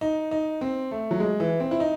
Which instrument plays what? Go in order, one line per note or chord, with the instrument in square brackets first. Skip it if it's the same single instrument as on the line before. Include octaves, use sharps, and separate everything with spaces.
[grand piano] D#4
D#4
C4
A3
F#3
G#3
E3
C4
E4
D#4